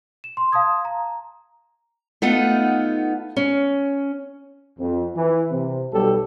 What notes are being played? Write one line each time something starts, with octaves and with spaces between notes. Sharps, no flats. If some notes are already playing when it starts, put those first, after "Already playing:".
E7
C6
F5 A5 C6 D#6 G#6
A#5
A3 B3 D#4 F4 F#5
C#4
F2
E3
C3
B1 G3 G4 A4